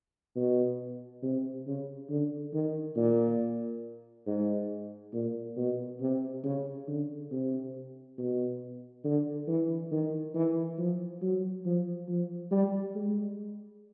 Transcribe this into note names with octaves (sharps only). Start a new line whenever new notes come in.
B2
C3
C#3
D3
D#3
A#2
G#2
A#2
B2
C3
C#3
D3
C3
B2
D3
E3
D#3
E3
F3
F#3
F3
F3
G3
G#3